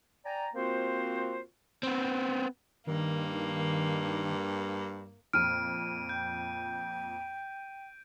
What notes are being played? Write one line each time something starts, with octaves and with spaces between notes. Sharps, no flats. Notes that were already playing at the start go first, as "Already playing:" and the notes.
D5 G5 G#5 A#5
A#3 C4 F4 F#4 A#4 C5
B3 C4
G2 D#3 A#3
F2 A#2 F6 D7 D#7
G5 G6